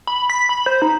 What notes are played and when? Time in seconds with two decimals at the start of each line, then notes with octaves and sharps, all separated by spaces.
0.07 B5
0.30 B6
0.49 B5
0.66 C5
0.82 D#4